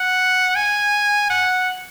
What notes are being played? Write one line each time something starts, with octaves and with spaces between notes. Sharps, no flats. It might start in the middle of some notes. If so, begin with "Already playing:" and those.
Already playing: F#5
G#5
F#5